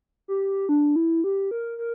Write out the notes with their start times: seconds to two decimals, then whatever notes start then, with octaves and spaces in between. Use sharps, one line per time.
0.28 G4
0.69 D4
0.96 E4
1.24 G4
1.51 A#4
1.78 A#4